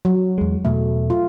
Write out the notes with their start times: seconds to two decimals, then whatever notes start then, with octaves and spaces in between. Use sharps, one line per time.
0.05 F#3
0.38 E2 G#3
0.65 E2 B2 A3
1.10 F4